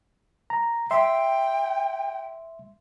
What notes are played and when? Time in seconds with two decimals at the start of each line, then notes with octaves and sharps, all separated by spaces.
0.50 A#5
0.91 E5 G5 C6